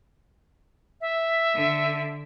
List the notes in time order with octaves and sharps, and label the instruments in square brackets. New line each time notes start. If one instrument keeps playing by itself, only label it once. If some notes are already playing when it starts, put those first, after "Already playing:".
[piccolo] E5
[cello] D3